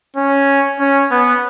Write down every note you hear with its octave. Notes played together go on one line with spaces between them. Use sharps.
C#4
C#4
B3